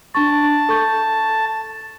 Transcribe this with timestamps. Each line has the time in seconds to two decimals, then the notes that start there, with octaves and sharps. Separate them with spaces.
0.15 D4 A5 C#6
0.69 A4 C#6 G6